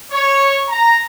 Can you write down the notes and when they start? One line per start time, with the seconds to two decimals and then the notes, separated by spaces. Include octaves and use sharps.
0.11 C#5
0.68 A#5